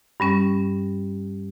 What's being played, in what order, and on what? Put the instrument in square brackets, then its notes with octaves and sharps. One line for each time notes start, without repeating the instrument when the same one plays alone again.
[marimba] G2 G3 C#4